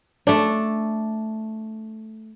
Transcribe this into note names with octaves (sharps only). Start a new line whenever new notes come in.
A3 D4